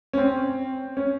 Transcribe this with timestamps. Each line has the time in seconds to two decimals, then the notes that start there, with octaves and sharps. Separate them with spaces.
0.13 C#4
0.18 C4
0.97 C#4